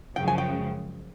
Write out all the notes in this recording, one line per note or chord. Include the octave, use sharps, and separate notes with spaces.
F#2 C#3 F3 G#3 G5
G#5
G5